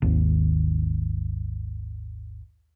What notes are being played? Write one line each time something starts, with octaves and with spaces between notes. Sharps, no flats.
G#1 D#2